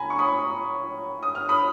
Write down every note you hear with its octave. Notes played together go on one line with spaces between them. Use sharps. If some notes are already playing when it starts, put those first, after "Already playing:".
Already playing: G#5 A#5 B5
C#6
B5 D#6
D#6
F6
B5 D#6